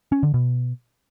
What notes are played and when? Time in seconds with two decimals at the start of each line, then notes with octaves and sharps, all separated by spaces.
0.12 C#4
0.23 D3
0.34 B2